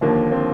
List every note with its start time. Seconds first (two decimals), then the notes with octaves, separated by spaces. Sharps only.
0.01 D#2 D3 F3 A#3
0.32 C4